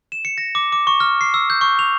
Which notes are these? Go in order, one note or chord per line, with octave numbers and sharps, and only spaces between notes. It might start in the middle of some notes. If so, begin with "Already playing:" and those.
E7
C#7
A#6
D6
D6
C#6
F6
C7
E6
G6
C#6
F7